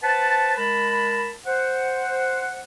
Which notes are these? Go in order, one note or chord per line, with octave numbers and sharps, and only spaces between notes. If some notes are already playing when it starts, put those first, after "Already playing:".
B4 C5 F#5 A5
G#3 A#4 A5 B5
C5 F#5